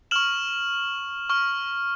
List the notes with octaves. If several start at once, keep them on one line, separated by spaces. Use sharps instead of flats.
C#6 F6 E7 F#7
C#6 F6